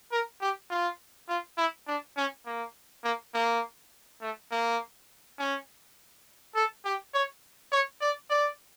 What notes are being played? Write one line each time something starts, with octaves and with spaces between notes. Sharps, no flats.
A#4
G4
F4
F4
E4
D4
C#4
A#3
A#3
A#3
A3
A#3
C#4
A4
G4
C#5
C#5
D5
D5